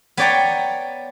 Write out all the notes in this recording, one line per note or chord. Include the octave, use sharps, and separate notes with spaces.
B3 C#5 D5 G5 A#5